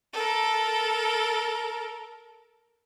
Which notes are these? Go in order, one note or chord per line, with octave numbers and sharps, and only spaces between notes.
A4 A#4